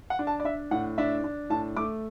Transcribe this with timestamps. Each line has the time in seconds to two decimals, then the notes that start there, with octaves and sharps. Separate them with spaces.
0.10 F#5
0.19 D4
0.27 A5
0.40 D5
0.44 D4 E5
0.71 A2 F#5
0.98 D4 E5
1.24 D4
1.50 A2 A5
1.76 A3 D6